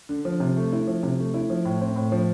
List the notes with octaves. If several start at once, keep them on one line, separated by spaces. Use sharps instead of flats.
D3
F3
C3
A3
E4
F3
C3
A3
E4
F3
A2
C4
A2
F3